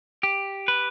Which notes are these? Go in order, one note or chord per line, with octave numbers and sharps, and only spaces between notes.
G4
B4